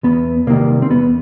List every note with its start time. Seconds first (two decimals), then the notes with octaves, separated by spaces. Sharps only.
0.04 E2 B3
0.47 C3 D#3 G3 A#3
0.82 C4
0.91 E2 B3